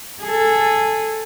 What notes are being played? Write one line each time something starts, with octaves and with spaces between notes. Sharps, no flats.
G#4 A4